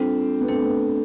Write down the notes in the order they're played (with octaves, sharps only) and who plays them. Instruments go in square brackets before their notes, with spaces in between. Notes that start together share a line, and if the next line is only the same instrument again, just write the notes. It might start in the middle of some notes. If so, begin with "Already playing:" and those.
Already playing: [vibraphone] G3 D4 F4 A4 [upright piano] C4
[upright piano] B3
[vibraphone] A3 D4 A4 [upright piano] C4
[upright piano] C4
B3